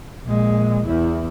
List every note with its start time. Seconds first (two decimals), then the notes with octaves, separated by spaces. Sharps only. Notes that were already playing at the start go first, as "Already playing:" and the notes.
0.25 A#1 G#3
0.87 E2 E4